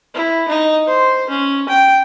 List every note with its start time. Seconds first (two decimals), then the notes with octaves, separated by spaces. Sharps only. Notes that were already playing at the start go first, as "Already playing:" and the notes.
0.14 E4
0.48 D#4
0.87 C5
1.29 C#4
1.68 G5